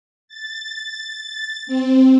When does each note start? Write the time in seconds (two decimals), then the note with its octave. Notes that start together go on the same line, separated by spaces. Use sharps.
0.28 A6
1.67 C4